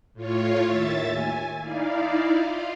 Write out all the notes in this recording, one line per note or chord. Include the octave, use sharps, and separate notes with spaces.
A2 F4 C#5
D#2 E5 A6
G#5
D#4 E4 D5 F5
F4